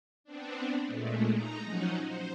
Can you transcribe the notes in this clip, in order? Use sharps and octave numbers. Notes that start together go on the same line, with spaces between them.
B3 C4 D4
A#2 G#3 A3
D#4 A#5
F3 F#3 C#4 D#4 F#4
C5